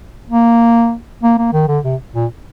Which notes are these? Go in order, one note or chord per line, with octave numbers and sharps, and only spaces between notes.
A#3
A#3
A#3
D#3
D3
C3
A#2